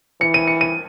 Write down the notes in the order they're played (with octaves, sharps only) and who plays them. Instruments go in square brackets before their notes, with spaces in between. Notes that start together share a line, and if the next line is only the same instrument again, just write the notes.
[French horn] E3 [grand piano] C#7
[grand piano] D#7
C#7
D#7